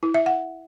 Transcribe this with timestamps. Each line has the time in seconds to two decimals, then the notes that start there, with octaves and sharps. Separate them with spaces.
0.03 E4
0.14 E5
0.26 F#5